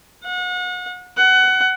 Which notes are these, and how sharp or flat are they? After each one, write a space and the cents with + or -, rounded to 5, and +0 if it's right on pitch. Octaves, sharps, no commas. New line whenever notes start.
F#5 -35
F#5 +20